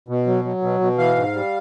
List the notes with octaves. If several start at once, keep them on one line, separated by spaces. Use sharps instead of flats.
B2
F#3
F#3
B2
B2
E3 F5
G#2
G3